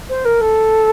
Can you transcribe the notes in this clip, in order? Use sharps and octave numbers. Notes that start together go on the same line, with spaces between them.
C5
A#4
A4